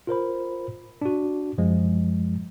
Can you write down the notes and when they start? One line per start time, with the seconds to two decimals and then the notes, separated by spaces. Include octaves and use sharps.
0.07 F4 A#4 C5 B5
1.02 D4 F#4
1.58 F#2 F3 G#3